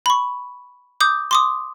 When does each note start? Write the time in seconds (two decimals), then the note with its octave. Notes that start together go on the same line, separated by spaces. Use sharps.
0.06 B5 C#6
1.00 D6 D#6 G6
1.31 C6 D6 D#6